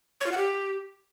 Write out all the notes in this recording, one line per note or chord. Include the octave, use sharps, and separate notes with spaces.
C#5
F4
F#5
G4